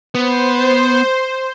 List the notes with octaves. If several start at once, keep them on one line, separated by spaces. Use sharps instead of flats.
B3 C5